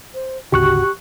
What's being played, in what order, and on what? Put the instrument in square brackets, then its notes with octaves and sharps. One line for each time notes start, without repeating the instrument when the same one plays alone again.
[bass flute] C5
[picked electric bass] G#1 D2 C#3 [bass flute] F#4 [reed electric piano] G4 C#6 F#6